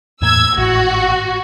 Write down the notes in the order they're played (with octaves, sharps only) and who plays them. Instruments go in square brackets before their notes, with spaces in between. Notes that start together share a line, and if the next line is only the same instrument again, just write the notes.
[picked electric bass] E2 A2 A#3 [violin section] E6 G#6
[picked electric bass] G#1 A2 [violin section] F#4